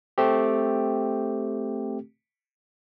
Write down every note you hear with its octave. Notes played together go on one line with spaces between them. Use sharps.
A3 C4 G4